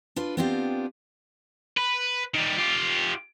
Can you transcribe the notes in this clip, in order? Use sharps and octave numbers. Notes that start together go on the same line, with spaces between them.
D4 F4 B4
B3 C4 D4 F4 G4 F5
B4
D#3 G3
F4 G4